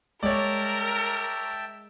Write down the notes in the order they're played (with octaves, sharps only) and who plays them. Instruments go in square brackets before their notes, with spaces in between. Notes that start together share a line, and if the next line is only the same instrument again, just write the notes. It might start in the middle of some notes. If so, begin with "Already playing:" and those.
[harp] G#3 [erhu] A#4 [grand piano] C#5 D5 [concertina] E5 G5 A5